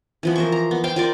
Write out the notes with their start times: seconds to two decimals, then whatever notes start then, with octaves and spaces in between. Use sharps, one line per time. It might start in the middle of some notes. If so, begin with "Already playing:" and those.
0.23 E3 F3 B3
0.36 A#4 C5 C#6
0.52 A#5
0.71 B3
0.84 C5 F5 G5
0.96 F4 A#4 D5